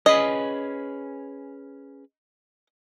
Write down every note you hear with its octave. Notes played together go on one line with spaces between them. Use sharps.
C#4 G#4 B4 D#5